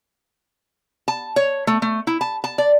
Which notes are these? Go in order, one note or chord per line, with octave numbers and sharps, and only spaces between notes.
A5
C#5
A3
A3
E4
A5
A5
D5